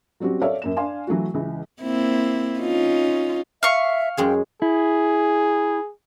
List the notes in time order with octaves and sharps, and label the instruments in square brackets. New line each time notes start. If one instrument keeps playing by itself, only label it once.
[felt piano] F#3 G3 C4 C#4 F#4
A4 C#5 D5 E5 F5
F#2 A#3 E7
D4 F5 G#5 C6
E3 F#3 A3 F#4
C#2 E3
[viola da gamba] A#3 C4 E4
C#4 D#4 F4
[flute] E5 [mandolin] F5 C#6
[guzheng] F#2 G#3 G#4 [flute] G5
[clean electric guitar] E4 [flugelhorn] G#4